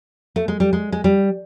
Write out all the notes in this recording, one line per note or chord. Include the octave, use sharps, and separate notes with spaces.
A3
G#3
G3
G#3
G#3
G3